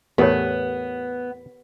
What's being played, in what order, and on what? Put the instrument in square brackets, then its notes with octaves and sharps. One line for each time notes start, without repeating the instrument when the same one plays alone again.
[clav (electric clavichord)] E2 A2 [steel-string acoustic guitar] B3 [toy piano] G4 A#4 C#5